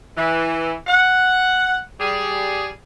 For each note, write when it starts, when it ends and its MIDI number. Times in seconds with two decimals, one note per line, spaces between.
0.17 0.72 52
0.87 1.76 78
2.00 2.68 55
2.00 2.68 68